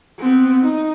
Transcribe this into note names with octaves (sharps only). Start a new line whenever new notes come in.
B3 C4
D#4